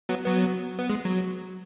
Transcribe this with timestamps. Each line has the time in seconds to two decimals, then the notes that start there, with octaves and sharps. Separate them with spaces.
0.09 F#3 B3
0.25 F#3 B3
0.79 B3
0.90 G#3
1.05 F#3